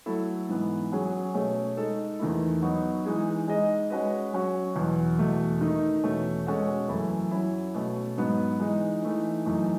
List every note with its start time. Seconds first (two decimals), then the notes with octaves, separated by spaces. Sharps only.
0.06 F#3 A3 E4 A4
0.49 G#2 E3 B3
0.92 F#3 C#4 G#4
1.34 B2 A3 C#4 G#4 C#5
1.77 G#3 D#4 A4
2.19 E2 D#3 A3 E4
2.62 F#3 B3 D#4 F#4
3.05 E3 G#3 D#4 G#4
3.48 G#3 D#4 G#4 D#5
3.90 G#3 C#4 F#4 B4 D#5
4.33 F#3 C#4 F#4
4.76 E2 B2 F#3
5.19 E2 B2 A3
5.61 D#3 A3 D#4
6.04 E2 B2 A3 C#4
6.46 B2 G#3 C#4 F#4 A4
6.88 F#2 E3 A3 E4 A4
7.31 F#3 C#4 E4
7.74 B2 A3 C#4
8.18 G#2 F#3 B3
8.60 E3 G#3 D#4
9.02 E3 A3 D#4
9.45 F#2 E3 A3 D#4